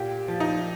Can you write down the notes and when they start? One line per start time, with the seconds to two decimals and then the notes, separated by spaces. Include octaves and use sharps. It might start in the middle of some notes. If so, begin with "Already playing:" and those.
Already playing: A#2 G4
0.28 F3
0.40 D#4